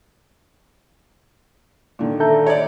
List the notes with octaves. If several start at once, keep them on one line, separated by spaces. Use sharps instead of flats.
A#2 D3 D#3
A4 E5 A#5 G6
C#5 D5